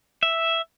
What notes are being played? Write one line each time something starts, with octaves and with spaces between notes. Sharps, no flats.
E5